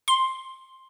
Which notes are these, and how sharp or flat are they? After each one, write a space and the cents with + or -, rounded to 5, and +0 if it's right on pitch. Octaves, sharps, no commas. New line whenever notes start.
C6 +5